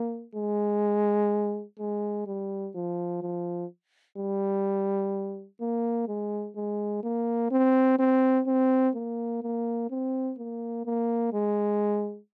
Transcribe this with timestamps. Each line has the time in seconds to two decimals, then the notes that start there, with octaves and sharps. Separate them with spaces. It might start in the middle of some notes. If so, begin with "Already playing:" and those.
Already playing: A#3
0.35 G#3
1.79 G#3
2.27 G3
2.75 F3
3.22 F3
4.18 G3
5.61 A#3
6.08 G#3
6.56 G#3
7.03 A#3
7.51 C4
7.99 C4
8.47 C4
8.95 A#3
9.43 A#3
9.90 C4
10.38 A#3
10.86 A#3
11.33 G#3